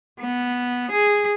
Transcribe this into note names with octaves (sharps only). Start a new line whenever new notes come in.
B3
G#4